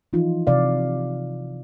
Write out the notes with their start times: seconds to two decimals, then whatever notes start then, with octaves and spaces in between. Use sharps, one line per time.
0.13 E3 F3 D#4 F4
0.47 C3 D5 F5